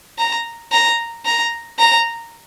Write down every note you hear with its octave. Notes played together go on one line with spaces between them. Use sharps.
A#5
A#5
A#5
A#5